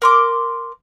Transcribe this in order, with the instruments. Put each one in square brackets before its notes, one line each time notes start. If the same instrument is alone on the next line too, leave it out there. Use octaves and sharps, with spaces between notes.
[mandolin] A#4 C6 D6